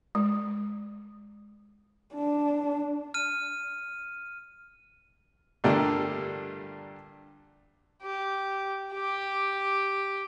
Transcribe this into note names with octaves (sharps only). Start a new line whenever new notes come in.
G#3
D4
F6 D#7
G2 A#2 D3 G3 A3 A#3
G4
G4